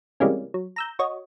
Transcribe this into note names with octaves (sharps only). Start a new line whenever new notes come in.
C3 E3 G3 G#3 A#3 C#4
F#3
A#5 E6 G6
F#4 C#5 D#5